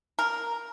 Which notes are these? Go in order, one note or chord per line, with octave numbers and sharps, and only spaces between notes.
A#4